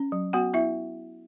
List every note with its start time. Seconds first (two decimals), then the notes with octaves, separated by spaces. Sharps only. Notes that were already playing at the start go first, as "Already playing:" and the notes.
Already playing: C#4
0.12 F#3
0.33 B3 F#4 F#5
0.53 B3 E4 E5